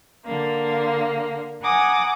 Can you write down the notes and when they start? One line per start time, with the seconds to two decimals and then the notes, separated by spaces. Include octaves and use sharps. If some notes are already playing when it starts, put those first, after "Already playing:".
0.25 D3 A#3
1.62 F#5 G#5 A#5 D6 D#6